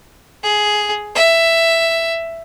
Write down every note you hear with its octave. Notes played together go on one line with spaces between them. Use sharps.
G#4
E5